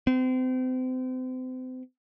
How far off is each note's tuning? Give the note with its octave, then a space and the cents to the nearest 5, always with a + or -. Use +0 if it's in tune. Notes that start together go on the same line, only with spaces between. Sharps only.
C4 -35